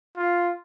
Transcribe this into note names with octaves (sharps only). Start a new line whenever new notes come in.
F4